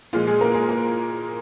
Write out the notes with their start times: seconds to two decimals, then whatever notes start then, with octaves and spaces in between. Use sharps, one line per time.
0.13 A#2 F3 G#3 F4
0.27 G#3 G#4
0.41 A#3 A#4
0.55 G#3 G#4
0.69 A#3 A#4